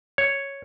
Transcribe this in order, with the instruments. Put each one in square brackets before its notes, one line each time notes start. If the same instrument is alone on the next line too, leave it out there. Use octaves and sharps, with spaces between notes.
[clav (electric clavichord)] C#5